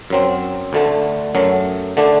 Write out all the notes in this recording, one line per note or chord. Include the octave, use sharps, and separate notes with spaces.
F#2 F#3 C4
D2 D3 A3
F#2 F#3 A3
D3 A3 D4